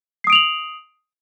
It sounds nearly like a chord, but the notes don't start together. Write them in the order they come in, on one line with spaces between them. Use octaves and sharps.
C7 D#6 D7 F7 F#7